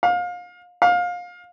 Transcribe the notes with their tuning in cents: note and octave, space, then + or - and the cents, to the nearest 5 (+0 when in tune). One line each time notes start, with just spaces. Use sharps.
F5 +30
F5 +25